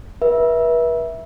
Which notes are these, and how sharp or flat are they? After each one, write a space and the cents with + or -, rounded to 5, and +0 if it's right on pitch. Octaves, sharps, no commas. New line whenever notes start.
B4 -40 E5 -10